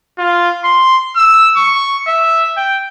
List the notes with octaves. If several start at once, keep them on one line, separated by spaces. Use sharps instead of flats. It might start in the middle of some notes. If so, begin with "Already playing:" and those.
F4
C6
E6
C#6
E5
G5